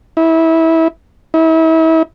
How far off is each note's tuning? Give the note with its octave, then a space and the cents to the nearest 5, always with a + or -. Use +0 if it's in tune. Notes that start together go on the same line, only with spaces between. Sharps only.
E4 -20
E4 -35